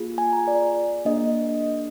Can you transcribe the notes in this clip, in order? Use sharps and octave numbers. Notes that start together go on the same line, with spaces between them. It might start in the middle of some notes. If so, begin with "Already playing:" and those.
Already playing: A#3 F4 G#4
G#5
A#5
D5
A#3 D4 G#4 D#5